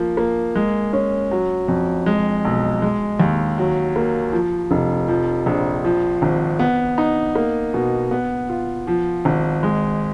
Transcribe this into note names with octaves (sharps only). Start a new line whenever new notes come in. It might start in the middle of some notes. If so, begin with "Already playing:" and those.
Already playing: F3 A#3
A#3
G#3
C#4
F#3
F2
G#3
B1
G#3
D#2
F#3
A#3
F3
F1
F3
A#1
F3
G#1
B3
D#4
A#3
B2
B3
F4
F3
G#1
G#3